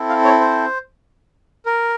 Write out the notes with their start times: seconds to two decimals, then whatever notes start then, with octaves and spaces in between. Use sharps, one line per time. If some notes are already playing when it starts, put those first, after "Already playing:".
Already playing: C4 E4 A4
0.09 F5
0.25 C#5
0.41 C5
1.66 A#4